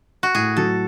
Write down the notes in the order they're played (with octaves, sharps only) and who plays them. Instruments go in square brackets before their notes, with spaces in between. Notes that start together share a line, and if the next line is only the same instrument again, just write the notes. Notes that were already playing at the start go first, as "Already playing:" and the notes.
[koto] F#4
[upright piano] A2 [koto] G#4
[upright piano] F#3 [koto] A4